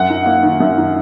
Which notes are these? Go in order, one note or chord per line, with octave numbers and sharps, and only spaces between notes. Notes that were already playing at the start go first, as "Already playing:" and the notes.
Already playing: F#2 F#5
D#4
A#3
D#3
F#2
D#4